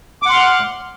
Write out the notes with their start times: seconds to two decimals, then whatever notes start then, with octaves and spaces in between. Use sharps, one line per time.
0.22 D6
0.26 F#5
0.29 C6
0.33 F6
0.36 F#6